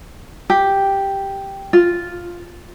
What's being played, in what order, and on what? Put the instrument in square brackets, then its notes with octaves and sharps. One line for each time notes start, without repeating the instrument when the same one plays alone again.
[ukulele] G4
F4